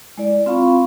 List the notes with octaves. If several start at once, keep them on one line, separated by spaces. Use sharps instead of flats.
G#3 E4 D5
C4 F4 F5 B5 C#6